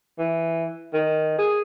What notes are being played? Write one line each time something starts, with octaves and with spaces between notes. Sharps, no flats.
E3
D#3
G#4